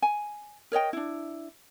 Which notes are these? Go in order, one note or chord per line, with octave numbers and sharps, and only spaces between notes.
G#5
A#4 C#5 D#5 G5
D4 E4